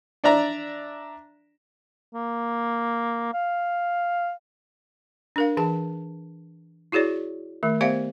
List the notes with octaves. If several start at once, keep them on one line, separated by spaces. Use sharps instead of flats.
D4 D5 E5 A#5
A#3
F5
D4 A#4 F5
E3 G#4 A5
E4 F#4 G#4 C#5 D5
D#3 A3
B3 G4 C5 D5 E5 F5